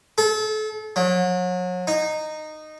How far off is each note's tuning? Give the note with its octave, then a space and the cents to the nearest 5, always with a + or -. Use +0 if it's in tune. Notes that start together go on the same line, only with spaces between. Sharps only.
A4 -35
F#3 -35
D#4 -15